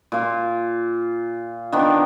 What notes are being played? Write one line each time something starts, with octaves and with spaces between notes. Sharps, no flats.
A#2 F4
D#3 B3 C4 D4